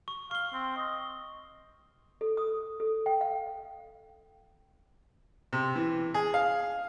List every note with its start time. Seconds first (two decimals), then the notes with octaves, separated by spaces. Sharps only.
0.08 C#6
0.31 F5 C#6 G7
0.54 C4
0.77 D#5
2.21 A4
2.37 D#6
2.80 A4
3.06 G5
3.21 F5
5.53 C3
5.75 E3
6.14 G#4
6.34 F5